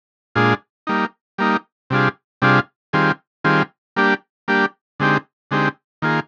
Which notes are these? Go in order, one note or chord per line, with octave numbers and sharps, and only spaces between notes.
A#2 G#3 D4 F4 G#4
G3 A#3 D#4
G3 A#3 D#4
C3 G3 D4 F4 G#4
C3 G3 D4 F4 G#4
D#3 G3 C4 F4 G#4
D#3 G3 C4 F4 G#4
G3 A#3 D4 G4
G3 A#3 D4 G4
D3 G#3 C4 D#4 G4
D3 G#3 C4 D#4 G4
D#3 A#3 F4 G#4